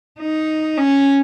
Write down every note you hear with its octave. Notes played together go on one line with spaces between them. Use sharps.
D#4
C#4